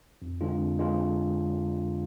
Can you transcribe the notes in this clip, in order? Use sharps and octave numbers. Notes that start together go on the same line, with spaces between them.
F2
D3 G#3 D4 F4
F2
D3 G#3 D4 F4